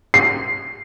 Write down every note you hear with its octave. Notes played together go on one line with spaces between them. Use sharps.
C7